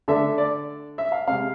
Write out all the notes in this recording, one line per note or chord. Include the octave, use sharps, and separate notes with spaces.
D3 A3 D4 E5
D5
E5
F5
C3 G#3 C4 F5